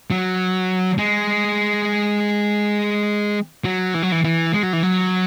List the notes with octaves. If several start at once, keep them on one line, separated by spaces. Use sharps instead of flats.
F#3
G#3
F#3
E3
F#3
E3
E3
G#3
F#3
E3
F#3